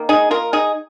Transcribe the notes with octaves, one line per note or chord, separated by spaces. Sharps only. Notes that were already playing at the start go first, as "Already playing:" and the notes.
Already playing: D#3 A#3
D#4 G#4
F4 A#4
D#4 G#4